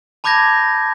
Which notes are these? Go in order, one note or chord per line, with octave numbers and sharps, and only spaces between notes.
A5 B5 D6 G6 G#6 A#6